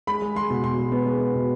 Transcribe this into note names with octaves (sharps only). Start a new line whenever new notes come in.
G#3 B5
G#3
G#3 C6
B2
B2 C6
G#3
B3
G#3
B3
B2